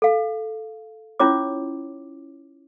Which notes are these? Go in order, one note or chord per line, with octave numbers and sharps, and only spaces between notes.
A4 F5
C#4 E4 F4 C#5 D6